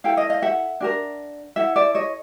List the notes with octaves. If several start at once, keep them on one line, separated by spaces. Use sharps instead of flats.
E4 A4 F5 G5
D#5 F5
D#5 F5
E5 F#5
D4 F#4 A#4
E4 A4 E5 F#5
D5 E5
C#5 D#5